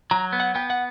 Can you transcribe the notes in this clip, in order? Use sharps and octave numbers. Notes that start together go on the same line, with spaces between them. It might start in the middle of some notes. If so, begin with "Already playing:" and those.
F#3 A#5
B3
F#5
B3 G5
F#5